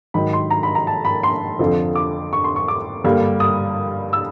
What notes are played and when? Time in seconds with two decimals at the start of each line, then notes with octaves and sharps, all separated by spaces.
0.14 G#2 D#3 F#3 B5
0.33 C6
0.50 A#5
0.63 B5
0.75 A#5
0.87 A5
1.05 B5
1.23 C6
1.59 F2 D3 F3
1.95 D6
2.33 C#6
2.44 C6
2.56 C#6
2.68 D6
3.04 G2 D3 G3 A#3
3.40 D#6
4.13 E6